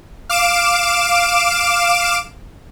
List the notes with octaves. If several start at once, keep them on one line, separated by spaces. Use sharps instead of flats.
F5 D6 D7 E7